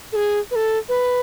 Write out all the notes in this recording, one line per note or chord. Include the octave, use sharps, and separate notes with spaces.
A4
G#4
B4
A4
B4